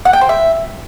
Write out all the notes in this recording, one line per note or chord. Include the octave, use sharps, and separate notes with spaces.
F#5
G5
C5
E5